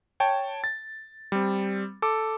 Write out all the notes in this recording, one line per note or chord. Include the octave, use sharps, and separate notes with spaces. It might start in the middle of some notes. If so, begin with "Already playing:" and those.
C#5 G5 A5
A6
G3 C4
A4 D6